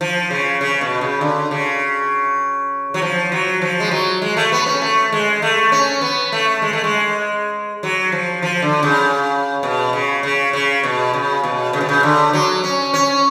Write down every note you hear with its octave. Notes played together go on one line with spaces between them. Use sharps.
F3
C#3
C#3
B2
C#3
D3
C#3
F#3
F3
F#3
F3
G#3
F#3
G#3
A3
B3
C#4
A3
G#3
A3
C#4
B3
A3
G#3
A3
G#3
F#3
F3
F3
D3
C#3
B2
C#3
C#3
C#3
B2
C#3
B2
C#3
B2
C#3
D3
F#3
C#4
C#4